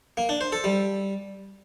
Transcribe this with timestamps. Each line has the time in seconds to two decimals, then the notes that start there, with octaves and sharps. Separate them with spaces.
0.17 A#3
0.29 D4
0.41 C5
0.52 A4
0.64 G3